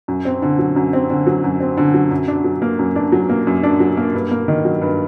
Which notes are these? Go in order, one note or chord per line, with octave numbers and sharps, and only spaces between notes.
F#2
C4
D3
F#3
F#2
C4
D3
F#3
F#2
C4
D3
F#3
F#2
D4
F#3
A#3
F#2
D4
F#3
A#3
F#2
D4
F#3
A#3
G2
A#3
D#3
F#3
G2